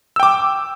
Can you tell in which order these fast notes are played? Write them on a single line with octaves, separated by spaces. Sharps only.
E6 G5 D6